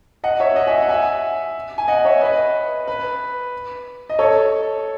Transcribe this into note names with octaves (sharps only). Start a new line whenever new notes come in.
D#5 F#5
C#5 E5
D#5 F#5
E5 G#5
F#5
E5 G#5
G#5
D#5 F#5
C#5 E5
B4 D#5
B4
D#5
A4 C#5